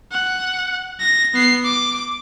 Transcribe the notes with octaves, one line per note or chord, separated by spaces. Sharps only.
F#5
A#6
B3 C7
D6